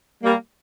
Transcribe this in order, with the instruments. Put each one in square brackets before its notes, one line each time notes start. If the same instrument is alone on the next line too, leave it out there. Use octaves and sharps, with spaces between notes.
[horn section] G3 A#3